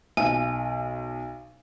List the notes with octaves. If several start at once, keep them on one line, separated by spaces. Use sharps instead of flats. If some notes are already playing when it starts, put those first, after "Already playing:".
B1 G#5